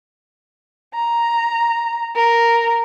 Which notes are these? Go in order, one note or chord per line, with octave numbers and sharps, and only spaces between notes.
A#5
A#4